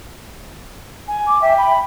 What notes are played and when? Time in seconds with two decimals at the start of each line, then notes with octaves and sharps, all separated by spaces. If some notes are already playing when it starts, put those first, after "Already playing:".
1.08 G#5
1.27 D6
1.42 E5 G5
1.58 B5